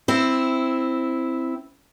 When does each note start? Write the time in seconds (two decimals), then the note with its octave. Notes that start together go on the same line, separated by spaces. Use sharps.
0.08 C4 E4